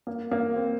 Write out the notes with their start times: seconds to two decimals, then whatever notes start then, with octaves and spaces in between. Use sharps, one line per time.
0.07 A#3
0.32 A#3
0.56 C4